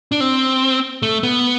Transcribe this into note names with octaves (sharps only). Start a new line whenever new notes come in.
D4
C4
A3
B3